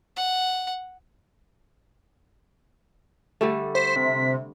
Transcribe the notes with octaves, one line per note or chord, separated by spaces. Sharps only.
F#5
D3 G3 A3
C5 B6
C3